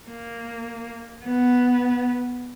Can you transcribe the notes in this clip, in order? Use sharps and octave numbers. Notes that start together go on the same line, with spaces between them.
A#3
B3